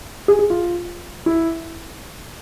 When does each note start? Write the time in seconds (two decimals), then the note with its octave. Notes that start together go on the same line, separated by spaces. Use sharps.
0.28 G#4
0.39 G#4
0.50 F4
1.26 E4